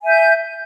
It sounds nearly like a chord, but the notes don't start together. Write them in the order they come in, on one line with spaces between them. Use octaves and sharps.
G#5 E5 G6